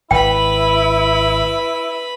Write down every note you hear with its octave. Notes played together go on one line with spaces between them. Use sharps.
G#1 E4 B4 G5 B5